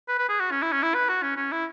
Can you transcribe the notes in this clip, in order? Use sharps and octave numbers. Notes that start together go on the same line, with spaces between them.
B4
B4
G#4
F#4
C#4
E4
C#4
E4
B4
F#4
C#4
C#4
E4